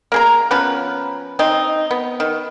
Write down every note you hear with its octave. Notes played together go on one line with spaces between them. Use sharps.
A#3 G#4 A#5
F3 B3 C#4 B4
C4 D#4
B3
D#3